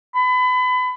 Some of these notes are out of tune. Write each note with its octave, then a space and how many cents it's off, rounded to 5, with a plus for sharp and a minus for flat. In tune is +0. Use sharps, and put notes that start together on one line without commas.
B5 +30